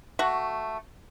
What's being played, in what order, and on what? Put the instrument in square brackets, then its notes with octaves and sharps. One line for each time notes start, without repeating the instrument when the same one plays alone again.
[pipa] A3 F#4